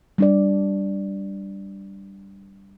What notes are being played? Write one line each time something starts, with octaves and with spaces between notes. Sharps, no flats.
G3 D4 D5